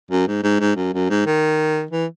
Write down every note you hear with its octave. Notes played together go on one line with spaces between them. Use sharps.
F#2
G#2
G#2
G#2
F#2
F#2
G#2
D#3
E3